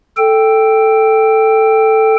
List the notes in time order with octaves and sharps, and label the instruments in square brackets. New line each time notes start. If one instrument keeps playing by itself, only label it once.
[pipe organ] A4 G5